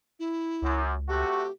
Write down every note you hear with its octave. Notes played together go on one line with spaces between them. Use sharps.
E4
C#2 F#2
C3 A3 F#4 G4